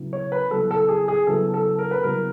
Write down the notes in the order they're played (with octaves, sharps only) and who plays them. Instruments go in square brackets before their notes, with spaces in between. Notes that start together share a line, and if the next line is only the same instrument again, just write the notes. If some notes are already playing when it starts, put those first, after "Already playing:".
Already playing: [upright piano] C#3 F#3 B3 E4
[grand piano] C#5
B4
[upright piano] C#3 F#3 B3 E4 [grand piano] A4
[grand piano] A4
G#4
G#4
[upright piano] C#3 F#3 B3 E4 [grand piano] A4
[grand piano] A4
A#4
B4
[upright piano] C#3 F#3 B3 E4 [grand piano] A#4